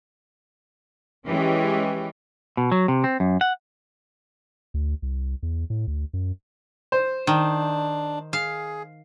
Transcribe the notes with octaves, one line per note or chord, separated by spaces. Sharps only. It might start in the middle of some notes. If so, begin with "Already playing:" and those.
E3 G#3 C#4 G4
B2
F#3
C3
C4
F#2
F#5
D2
C2
E2
A2
D2
F#2
C5
D#3 D4
G#4 F5